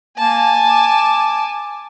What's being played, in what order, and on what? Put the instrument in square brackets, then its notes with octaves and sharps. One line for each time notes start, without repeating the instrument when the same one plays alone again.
[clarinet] A#3 [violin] G#5 A5
[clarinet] D6